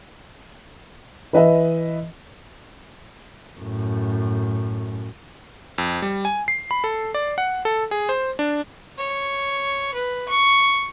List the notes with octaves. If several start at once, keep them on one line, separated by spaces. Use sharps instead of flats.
E3 B4 D#5 E5
F#2 A2
F2
G3
G#5
C7
B5
A4
D5
F#5
A4
G#4
C5
D4
C#5
B4
C#6